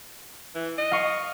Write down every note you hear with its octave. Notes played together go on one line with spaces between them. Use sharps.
E3
D#5
F5 C#6